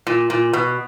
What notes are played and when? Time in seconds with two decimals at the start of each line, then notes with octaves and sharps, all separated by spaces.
0.07 A#2
0.30 A#2
0.53 B2